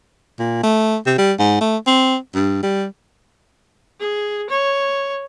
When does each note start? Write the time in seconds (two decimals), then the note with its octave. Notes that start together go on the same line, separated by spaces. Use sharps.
0.39 A#2
0.63 A3
1.06 C3
1.18 G3
1.39 G#2
1.61 A3
1.87 C4
2.35 G2
2.63 G3
4.00 G#4
4.49 C#5